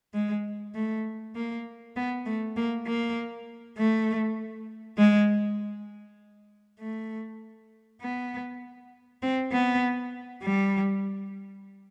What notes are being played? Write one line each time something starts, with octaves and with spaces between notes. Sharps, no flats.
G#3
A3
A#3
B3
A3
A#3
A#3
A3
G#3
A3
B3
C4
B3
G3